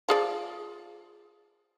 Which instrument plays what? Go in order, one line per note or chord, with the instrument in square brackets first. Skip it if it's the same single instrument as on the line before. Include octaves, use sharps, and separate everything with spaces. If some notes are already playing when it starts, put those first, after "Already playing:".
[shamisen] F3 G#4 D5